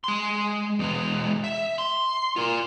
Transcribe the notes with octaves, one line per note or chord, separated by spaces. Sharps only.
G#3 C6
E2 G#3
E5
C6
F4 A#4